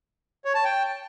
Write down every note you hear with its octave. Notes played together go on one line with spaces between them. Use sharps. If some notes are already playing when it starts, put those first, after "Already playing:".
C#5
A5
G5